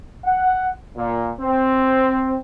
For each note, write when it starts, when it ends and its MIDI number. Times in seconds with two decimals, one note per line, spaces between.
0.24 0.69 78
0.96 1.30 46
1.40 2.37 60